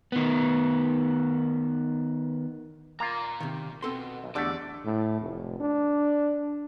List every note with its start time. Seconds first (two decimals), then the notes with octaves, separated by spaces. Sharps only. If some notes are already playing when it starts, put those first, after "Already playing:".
0.12 D#3 B3
3.00 A#2 A#3 F4 A#5
3.40 C3 D#3
3.82 B2 C4 A4 C6
4.24 B1
4.35 E2 D3 A3 D4 G4 D5
4.86 A2
5.21 F1
5.60 D4